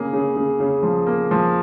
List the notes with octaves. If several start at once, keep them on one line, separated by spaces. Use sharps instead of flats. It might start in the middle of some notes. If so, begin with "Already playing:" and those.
Already playing: C#3 A#3 G#4
C#3
C#3
C#3
F3
A#3
F3